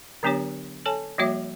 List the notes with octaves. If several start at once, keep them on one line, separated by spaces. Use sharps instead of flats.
D3 F#3 B3 D4 G4 C#5
A4 C#5 G#5 A5
F3 G3 A#3 F#4 C#5 E5